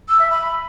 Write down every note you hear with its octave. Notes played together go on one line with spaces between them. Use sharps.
E6
E5
B5